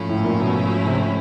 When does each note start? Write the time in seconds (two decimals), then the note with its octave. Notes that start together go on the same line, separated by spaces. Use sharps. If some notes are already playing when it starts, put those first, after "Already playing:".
Already playing: G#2 F3 A3 C#4 E4
0.09 A2
0.25 A#2
0.40 B2
0.86 C3